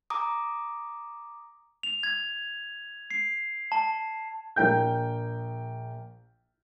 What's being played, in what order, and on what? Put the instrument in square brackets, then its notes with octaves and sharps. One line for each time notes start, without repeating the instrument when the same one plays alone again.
[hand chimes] A#5 D6 D#6
[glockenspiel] F7
G#6
C7
A5
[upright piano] A#1 A#4 G5 G6